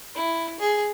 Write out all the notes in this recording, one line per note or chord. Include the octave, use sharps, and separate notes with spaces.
E4
G#4